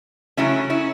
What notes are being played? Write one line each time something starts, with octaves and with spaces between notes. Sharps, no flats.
C#3 F#3 A3 C#4 E4
C#4 E4